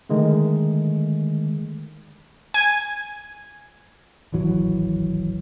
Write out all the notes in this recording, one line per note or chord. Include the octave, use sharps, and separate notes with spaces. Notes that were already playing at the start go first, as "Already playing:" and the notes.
D3 D#3 G#3 A3
G#5
D1 G#1 E3 F#3